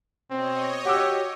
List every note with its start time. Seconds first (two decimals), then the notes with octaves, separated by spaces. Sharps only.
0.31 B2 C4 C#5 D#5
0.85 F#4 G4 F#5 D6 E6